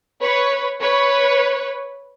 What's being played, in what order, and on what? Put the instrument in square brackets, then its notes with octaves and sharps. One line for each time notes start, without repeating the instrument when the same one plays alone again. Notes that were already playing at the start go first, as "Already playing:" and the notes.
[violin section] B4 C#5
B4 C#5